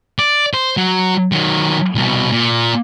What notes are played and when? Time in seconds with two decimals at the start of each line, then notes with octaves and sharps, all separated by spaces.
0.19 D5
0.54 C5
0.77 F#3
1.32 D#3 F#3
1.95 C2 B2
2.32 A#2